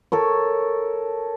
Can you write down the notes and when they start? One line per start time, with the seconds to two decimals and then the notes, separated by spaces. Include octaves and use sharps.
0.12 A4 A#4 C#5